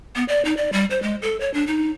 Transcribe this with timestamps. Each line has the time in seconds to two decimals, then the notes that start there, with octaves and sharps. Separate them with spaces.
0.16 B3
0.28 D5
0.45 D#4
0.57 D5
0.73 G3
0.90 C5
1.02 G#3
1.22 A4
1.40 C#5
1.54 D4
1.67 D#4